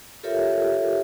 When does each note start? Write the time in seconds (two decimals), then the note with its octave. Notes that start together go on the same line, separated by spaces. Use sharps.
0.23 F4 G4 A4 A#4 C#5 E5